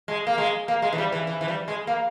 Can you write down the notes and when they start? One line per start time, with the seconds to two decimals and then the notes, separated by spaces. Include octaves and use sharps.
0.08 G#3
0.27 A#3
0.38 G#3
0.68 A#3
0.82 G#3
0.93 E3
0.98 G3
1.12 E3
1.27 E3
1.41 E3
1.48 G3
1.68 G#3
1.87 A#3